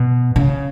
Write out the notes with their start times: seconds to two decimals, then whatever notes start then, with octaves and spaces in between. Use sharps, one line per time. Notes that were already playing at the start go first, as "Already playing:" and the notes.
Already playing: B2
0.36 C#3